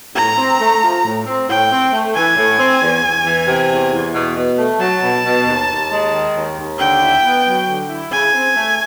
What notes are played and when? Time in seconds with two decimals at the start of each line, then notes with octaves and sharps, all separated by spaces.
0.15 A2 A#5
0.37 C4
0.60 A3
0.83 F3
1.04 A2
1.26 C4
1.48 A2 G5
1.71 C4
1.92 A3
2.15 E3 G#5
2.36 A2
2.59 C4
2.82 E2
3.04 E2
3.26 E3
3.48 C3
3.70 E2
3.91 E2
4.13 B2
4.37 B2
4.58 A3
4.80 F#3 A5
5.02 B2
5.25 B2
5.46 D#2
5.69 D#2
5.91 G#3
6.13 D#3
6.35 D#2
6.58 D#2
6.79 D3 G5
7.01 E4
7.24 B3
7.46 F#3
7.68 D3
7.89 E4
8.12 C#3 G#5
8.34 C4
8.56 A3